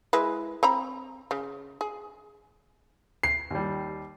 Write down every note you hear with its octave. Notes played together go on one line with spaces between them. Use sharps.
G#3 E4 B4
C4 A#5 B5
C#3
G#4
C7
D#2 G3